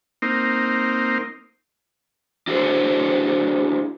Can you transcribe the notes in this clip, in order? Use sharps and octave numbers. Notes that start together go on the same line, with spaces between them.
A#3 C4 D#4
D4 E4 F#4 G#4 A4 C5